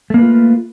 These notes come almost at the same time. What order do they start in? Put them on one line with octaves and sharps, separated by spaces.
A3 A#3 B4 F4